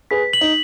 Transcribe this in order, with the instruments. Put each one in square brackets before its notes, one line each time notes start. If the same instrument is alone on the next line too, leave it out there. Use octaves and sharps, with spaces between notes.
[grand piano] G#4 B4 [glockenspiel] B6
[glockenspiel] F#7
[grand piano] D#4